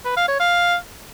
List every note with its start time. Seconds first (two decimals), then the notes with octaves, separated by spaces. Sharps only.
0.05 B4
0.17 F5
0.28 C#5
0.40 F5